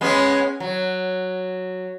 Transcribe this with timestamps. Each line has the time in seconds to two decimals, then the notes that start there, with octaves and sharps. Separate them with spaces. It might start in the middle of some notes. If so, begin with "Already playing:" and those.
0.01 G#3 B3 C#4
0.60 F#3